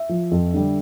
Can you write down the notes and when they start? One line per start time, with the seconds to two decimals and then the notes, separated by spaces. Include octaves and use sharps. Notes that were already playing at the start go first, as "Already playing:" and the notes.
Already playing: E5
0.09 F3
0.31 F2
0.54 D3 G3